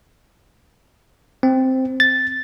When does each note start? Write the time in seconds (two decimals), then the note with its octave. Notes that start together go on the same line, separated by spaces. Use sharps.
1.43 C4
2.00 A6